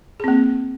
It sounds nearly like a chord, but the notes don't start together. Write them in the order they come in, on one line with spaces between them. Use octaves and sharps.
G#4 C4 A#3